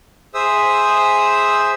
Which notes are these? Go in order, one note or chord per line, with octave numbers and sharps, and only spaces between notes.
G#4 C5 E5 D#6 E6